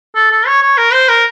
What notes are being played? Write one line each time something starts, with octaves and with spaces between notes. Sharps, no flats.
A4
A4
C#5
C#5
A#4
C5
A#4